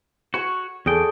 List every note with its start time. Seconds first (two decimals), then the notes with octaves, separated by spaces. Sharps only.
0.34 F#4 C#5 C#6
0.86 E2 G#4 A4 D5 G5